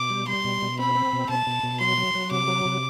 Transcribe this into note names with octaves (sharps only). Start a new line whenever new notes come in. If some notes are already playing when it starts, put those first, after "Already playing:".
Already playing: B2 D6
G3
G3 C6
B2
B2
C4 B5
C4
B2
B2 A5
B2
B2
F#3 C6
F#3
F#3
C3 D6
F#3
C3